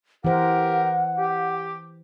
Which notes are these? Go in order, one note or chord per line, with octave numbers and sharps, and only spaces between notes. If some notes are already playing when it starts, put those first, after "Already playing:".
E3 G4 A#4 C5 F#5
G4